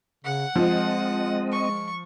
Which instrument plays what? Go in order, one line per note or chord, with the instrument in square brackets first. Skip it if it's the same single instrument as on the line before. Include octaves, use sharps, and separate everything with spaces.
[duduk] C#3 [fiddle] F#5
[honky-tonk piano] F3 [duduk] G#3 [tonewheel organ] C4 D#5
[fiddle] C#6